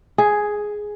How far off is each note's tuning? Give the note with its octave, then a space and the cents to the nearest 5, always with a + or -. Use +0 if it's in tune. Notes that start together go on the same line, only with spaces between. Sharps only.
G#4 +5